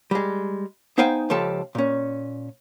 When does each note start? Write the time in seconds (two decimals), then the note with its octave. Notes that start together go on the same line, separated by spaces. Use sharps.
0.11 G3 G#3
0.98 B3 D#4 C5 F5 G5 G#5
1.30 C#2 F3 G4 A4 A5
1.75 A#2 C#4